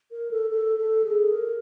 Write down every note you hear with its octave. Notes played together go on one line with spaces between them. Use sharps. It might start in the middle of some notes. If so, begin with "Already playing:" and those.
A#4
A4
A4
A4
G#4
A#4